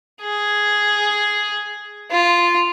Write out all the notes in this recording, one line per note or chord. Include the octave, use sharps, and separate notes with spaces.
G#4
F4